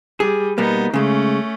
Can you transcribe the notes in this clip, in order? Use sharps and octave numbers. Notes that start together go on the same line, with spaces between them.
G3 G#4
B2 G3 A#3 B3 D#4
C#3 G#3 A3 C#4